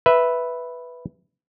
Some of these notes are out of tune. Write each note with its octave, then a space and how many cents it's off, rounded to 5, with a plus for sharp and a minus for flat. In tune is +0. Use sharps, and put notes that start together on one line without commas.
B4 +0 E5 +0